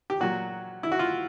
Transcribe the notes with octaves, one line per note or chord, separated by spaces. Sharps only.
G4
A#2 F#3 F#4
E4
F#4
F4